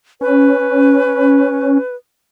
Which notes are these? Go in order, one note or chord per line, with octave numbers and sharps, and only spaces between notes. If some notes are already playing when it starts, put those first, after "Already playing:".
C#4 B4